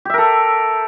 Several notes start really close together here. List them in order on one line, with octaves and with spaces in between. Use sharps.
G4 E5 A#4 A4